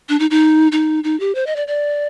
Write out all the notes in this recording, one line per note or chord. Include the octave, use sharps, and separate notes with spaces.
D4
D#4
D#4
D#4
D#4
G4
C5
D#5
D5
D5